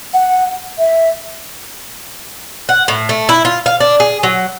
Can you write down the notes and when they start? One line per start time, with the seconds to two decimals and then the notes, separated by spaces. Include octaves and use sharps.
0.14 F#5
0.78 E5
2.69 F#5
2.88 A2
3.09 A3
3.29 E4
3.45 F4
3.66 F5
3.80 D4
4.00 G#4
4.23 F#3